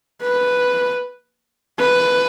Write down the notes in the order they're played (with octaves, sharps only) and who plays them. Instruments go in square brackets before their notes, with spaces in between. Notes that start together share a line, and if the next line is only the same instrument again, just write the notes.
[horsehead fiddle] B4
B4